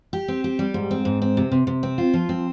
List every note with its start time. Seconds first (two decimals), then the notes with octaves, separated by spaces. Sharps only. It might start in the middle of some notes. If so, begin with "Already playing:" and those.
0.13 G4
0.28 C4
0.44 G4
0.59 G3
0.74 G#2
0.91 C4
1.05 G#2
1.22 C4
1.37 C3
1.52 C3
1.67 C3
1.83 C4
1.98 F4
2.13 F3
2.29 C4